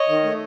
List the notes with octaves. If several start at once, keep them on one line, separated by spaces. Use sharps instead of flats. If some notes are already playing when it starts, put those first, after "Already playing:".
Already playing: C#5 D#5
D#3
A3